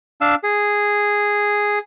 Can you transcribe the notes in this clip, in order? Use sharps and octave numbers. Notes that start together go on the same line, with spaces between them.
D4 F5 E6
G#4